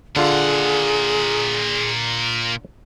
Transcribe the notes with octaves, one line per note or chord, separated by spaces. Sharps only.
A#2 D3 F4 G#4 F5 F#5